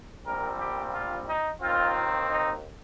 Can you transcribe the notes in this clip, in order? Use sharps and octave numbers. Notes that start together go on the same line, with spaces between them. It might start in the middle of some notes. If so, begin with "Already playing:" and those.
A#1 A#2 G3 C4 A#4
G4
F4
D#4
D#2 D#3 C4 F4
D#4